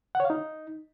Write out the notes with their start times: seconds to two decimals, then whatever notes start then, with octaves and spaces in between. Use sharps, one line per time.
0.15 F#5
0.20 C#5
0.25 F5
0.30 D#4